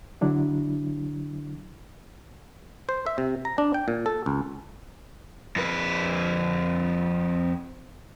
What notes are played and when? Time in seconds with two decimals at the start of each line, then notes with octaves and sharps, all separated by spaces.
0.21 D3 F#3 D4 E4
2.89 C5
3.06 E5
3.18 C3
3.45 A#5
3.58 D4
3.74 G5
3.88 A#2
4.06 A4
4.26 C#2
5.56 F2 B4